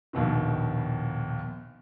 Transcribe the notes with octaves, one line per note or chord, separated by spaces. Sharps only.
A#1 D#2 B2 D#3